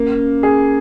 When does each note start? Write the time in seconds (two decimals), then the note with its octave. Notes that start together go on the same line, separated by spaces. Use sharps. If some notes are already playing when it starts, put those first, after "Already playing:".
Already playing: A#3 C#4 A#4
0.18 C#4
0.43 C#4 G#4